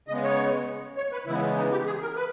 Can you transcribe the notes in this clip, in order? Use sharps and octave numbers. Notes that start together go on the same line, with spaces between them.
C#3 G#3 B3 D#5
C#5
C#5
B4
C#3 E3 G#3 B3 E4
D#4
G4
G#4
A#4
B4